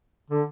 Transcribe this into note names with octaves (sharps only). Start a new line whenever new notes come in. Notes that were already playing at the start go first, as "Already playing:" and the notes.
D3